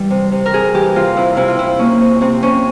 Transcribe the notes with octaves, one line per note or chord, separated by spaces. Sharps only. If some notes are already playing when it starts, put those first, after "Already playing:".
Already playing: E3 G3
C3
C3
A#4
C3 G#4
E3 G4
C3 F4
C3 E4
C3 E4
F4
C3 E4
A#3 C#4
C3
C3 C4
C3 C#4